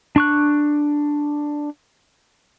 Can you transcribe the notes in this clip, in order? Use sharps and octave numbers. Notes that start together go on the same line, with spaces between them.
D4 C#6 F#6